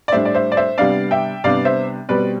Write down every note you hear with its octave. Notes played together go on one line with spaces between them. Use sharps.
D5
A2 G3 D4 C5 E5
D5
C5 E5
D5
C5 E5
C3 G3 B3 D4 D5 F5
E5 G5
C3 G3 B3 D4 D5 F5
C5 E5
B2 G3 C4 B4 D5